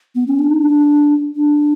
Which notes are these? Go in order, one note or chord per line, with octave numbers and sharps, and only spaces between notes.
B3
C#4
D4
D#4
D4
D4